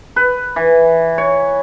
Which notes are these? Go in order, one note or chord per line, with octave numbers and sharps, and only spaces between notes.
B4
E3
C#5